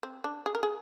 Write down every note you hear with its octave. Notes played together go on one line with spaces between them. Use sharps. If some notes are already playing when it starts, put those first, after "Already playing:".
C4
D4
G#4
A#4
G#4